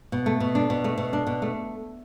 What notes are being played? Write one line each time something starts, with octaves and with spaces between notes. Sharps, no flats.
B2
A3
B2
D4
B2
A3
B2
D4
B2
A3